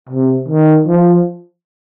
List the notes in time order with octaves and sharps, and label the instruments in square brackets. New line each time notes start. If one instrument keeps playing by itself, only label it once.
[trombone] C3
D#3
F3